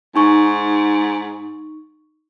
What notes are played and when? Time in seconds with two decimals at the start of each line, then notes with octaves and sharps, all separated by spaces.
0.15 G#2 D#4 C#6